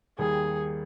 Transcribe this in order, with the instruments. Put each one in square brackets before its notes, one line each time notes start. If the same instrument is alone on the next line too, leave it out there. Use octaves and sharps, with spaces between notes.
[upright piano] D#2 D#3 G3 [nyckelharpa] G#4